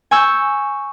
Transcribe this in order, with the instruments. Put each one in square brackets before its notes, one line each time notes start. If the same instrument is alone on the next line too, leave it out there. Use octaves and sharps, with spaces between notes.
[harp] G#5 C#6 E6 G6